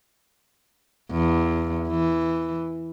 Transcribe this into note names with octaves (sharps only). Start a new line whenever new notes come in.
E2
E3